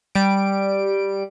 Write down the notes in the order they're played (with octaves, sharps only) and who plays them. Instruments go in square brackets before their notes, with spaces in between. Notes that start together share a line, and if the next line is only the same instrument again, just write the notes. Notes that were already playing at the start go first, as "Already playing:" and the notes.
[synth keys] G3 D7